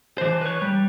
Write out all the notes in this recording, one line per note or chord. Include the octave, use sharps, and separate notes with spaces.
E3 C5
B4 C#5
G3